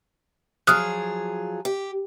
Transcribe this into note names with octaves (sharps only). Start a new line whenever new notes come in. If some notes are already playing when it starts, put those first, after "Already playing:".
F3 F#3 G#4 D#6 F6 F#6
G4